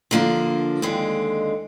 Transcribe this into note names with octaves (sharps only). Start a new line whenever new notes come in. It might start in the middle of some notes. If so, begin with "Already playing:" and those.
D3 F3 A#3 D4
D#2 D3 G#3 C4